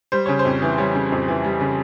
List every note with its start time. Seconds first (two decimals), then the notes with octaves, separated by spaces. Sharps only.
0.12 G3 C5
0.26 C#3 C#5
0.39 C5
0.45 F2
0.62 E3
0.78 G3 C#5
0.95 C#3
1.12 F2
1.28 E3
1.44 G3
1.61 C#3